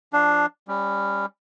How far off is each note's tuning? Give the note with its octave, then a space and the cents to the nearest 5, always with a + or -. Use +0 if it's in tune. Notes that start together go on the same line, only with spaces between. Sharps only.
F3 +0 D4 +0 F5 -5
G3 +20 C#4 +0